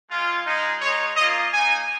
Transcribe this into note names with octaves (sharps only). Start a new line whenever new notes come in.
G#3 F4
G#3 D#4
G#3 D#4 C#5
A#3 F4 D#5
A#3 D#4 G#5